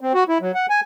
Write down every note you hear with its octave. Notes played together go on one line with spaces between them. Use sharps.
C4
F#4
E4
F#3
F#5
G#5